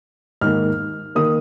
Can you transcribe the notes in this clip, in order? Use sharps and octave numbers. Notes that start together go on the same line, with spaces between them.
G#2 D#3 A#3 F6
D#3 A#3 D#6